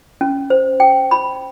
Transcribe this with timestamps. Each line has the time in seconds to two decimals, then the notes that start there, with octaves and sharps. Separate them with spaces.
0.21 C#4
0.50 C5
0.80 G5
1.11 B5